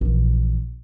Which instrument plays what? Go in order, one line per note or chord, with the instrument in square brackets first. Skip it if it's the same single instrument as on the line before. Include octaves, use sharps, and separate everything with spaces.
[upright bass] A#1 E3